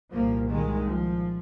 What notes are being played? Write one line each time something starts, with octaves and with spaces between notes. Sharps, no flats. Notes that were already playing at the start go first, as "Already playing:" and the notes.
C2 A#2 F3 A#3
D#3 G#3
F3